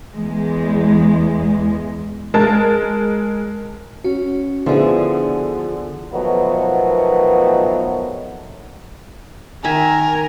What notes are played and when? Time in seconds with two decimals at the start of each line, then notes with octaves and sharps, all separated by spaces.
0.14 E2 G#3
2.34 G#3 A#4 A5 A6
4.04 C#4 F#4
4.66 D3 F3 B3 E4 F4 G#4
6.14 B2 D#3 F3 F#3 A3 B3
9.64 D#3 A#4 E5 G#5